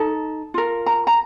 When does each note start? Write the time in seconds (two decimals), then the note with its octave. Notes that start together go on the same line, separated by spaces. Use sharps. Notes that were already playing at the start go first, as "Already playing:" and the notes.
Already playing: D#4 A4 A5
0.54 F4 A#4
0.86 A#5
1.07 A#5